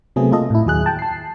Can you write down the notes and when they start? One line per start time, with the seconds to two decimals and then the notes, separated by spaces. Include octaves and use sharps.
0.16 C3 F#3 A3 B3 C4 G#4
0.31 A3 A#3 F4 A4 D#5
0.50 A2 E4
0.66 D#2 F#3 G#4 F#6
0.86 G5 A5
0.99 A5 C7